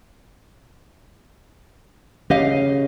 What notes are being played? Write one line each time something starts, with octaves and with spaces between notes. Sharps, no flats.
C#3 G4 D#5 F5